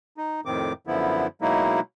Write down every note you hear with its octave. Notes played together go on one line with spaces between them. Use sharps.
D#4
F2 A2 D#3 C4 D6
F#2 D3 F3 B3 E4
B2 F#3 G#3 A#3 D#4 E4